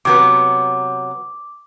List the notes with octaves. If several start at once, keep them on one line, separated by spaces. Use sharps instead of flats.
C3 F#3 B3 D6